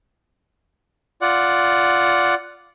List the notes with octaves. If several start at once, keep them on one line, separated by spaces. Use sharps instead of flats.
F4 D5 F#5